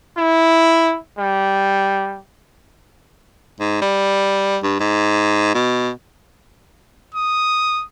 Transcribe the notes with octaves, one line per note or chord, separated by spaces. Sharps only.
E4
G3
G#2
G3
G2
G#2
B2
D#6